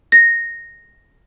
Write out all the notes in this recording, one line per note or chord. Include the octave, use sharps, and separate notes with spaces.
A#6